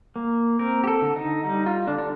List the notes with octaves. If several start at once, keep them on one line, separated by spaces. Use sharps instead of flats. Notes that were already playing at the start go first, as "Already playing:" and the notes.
A#3
C4 A#4
G4
A4
D3
D#4
G3 D#4
F4
D3 D4
D4